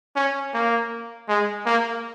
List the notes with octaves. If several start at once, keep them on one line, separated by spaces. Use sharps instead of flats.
C#4
A#3
G#3
A#3